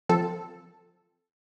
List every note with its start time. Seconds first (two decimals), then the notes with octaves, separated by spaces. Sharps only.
0.09 F3 C4 A4